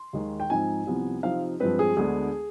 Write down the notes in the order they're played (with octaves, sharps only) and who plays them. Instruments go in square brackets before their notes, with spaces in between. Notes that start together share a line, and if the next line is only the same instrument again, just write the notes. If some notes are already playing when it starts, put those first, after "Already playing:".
Already playing: [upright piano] C6
D#2 D#3 G#3
G5
G#2 F3 C4 D#4 G#5
C2 C3 F3 B3
C3 F3 C4 D#4 F5
G2 F3 G#3 C4 B4
G#4
D2 D3 G#3 B3 D4 G#4